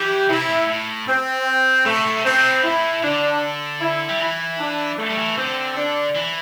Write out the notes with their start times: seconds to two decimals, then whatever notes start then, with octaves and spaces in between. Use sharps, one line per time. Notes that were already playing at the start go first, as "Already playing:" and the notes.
Already playing: E3 G4
0.29 C3 E4
0.49 A2
0.68 A2
1.07 C4
1.85 A2 A3
1.96 C3
2.06 A2
2.17 C3
2.25 A2 C4
2.38 C3
2.48 A2
2.64 E4
3.03 D3 D4
3.80 E4
4.08 G3
4.20 E3 E4
4.59 D4
4.98 A3
5.10 G3
5.18 E3
5.37 D3 C4
5.77 D4
6.15 E3